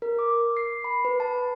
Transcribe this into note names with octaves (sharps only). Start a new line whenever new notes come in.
A#4
D6
C7
B5
B4
A5